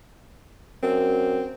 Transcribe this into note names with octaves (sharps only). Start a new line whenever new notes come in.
F#2 C4